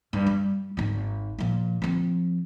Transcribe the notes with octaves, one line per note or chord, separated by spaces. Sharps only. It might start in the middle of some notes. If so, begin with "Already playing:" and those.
G2
G3
G#1 D#3
A#2 F3
F3 C4